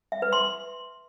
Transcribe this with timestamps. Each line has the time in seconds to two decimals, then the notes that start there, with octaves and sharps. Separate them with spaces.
0.12 E5
0.22 B4
0.32 C6